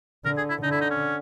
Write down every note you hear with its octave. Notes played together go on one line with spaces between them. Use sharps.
D3 A#4
G#4
E4
D3 D#4
E4
D#4
C#4